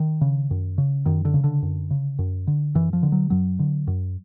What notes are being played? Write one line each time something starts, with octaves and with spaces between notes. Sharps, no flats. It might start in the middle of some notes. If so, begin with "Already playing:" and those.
Already playing: D#3
C#3
F#2
C#3
F#2 D#3
D3
C#3
D3
F#2
C#3
F#2
D3
F#2 E3
F3
D3
F#3
F#2 F#3
D3
F#2